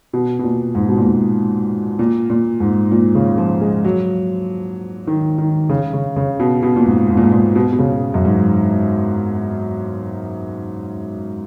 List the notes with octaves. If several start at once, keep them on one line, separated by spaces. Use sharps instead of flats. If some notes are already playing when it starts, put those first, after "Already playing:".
B2
B2
A#2
G#2
B2
A#2
G#2
A#2
A#2
G#2
A#2
C#3
F3
G#3
F#3
D#3
D#3
C#3
C#3
C#3
B2
B2
A#2
G#2
G#2
A#2
G#2
A#2
B2
B2
C#3
F#2
G#2